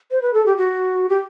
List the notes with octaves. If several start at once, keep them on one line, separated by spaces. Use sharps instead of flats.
C5
B4
A4
G4
F#4
G4